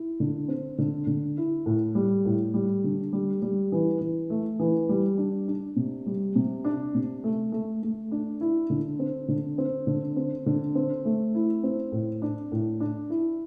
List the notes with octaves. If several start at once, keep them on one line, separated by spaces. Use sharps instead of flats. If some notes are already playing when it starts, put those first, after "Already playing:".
Already playing: E4
D3
C4
D3
D3
E4
A2
G3
A2
G3
D3
G3
G3
E3
E3
A3
E3
G3
D4
D4
C3
G3
C3
D4
C3
A3
A3
A3
D4
E4
D3
C4
D3
C4
D3
C4
D3
C4
A3
E4
C4
A2
D4
A2
D4
E4